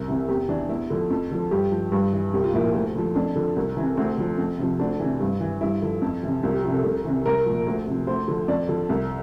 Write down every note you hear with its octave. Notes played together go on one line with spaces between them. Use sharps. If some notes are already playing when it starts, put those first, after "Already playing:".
Already playing: C2
C3 E3
E2 G4
E3 D4
E2 E4
D3 F3
F2
D3 F3
G2 G4
F3
G2
E3
C2 G4
F4
A#2 F3 E4
F4
D2
D3 F3
F2 D4
D3 F3
C2
C3 E3
D2 C4
D3 F3
F2
C3 F3
D2 D4
C3 E3
G2
E3
G2 E4
D3 F3
F2
C3 E3
C2 F4
G4
C3 F3 G4
A4
C2
C3 E3
C2 A#4
A#2 F3
D2
C3 F3
D2 C5
D3 F3
F2 D5
D3 F3
C2